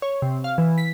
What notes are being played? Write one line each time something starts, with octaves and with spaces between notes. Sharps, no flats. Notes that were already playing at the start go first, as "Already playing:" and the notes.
C#5
C3
F5
E3
B6